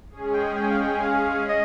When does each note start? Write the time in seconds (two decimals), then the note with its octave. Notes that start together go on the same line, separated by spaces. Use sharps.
0.10 G#3 C#4 G#4
0.34 G5
0.56 G5
0.71 F5
0.80 G5
1.02 F5
1.49 D#5